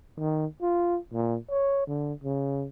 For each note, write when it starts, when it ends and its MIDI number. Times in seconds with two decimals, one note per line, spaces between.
0.19 0.46 51
0.62 0.98 65
1.13 1.37 46
1.50 1.87 73
1.87 2.13 50
2.24 2.66 49